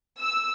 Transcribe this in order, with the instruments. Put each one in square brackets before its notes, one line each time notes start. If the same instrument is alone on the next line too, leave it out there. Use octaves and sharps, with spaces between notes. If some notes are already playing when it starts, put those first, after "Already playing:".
[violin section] E6